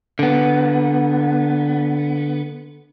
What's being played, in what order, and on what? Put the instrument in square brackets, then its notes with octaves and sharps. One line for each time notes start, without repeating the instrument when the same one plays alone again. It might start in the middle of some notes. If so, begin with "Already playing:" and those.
[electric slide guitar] D3 B3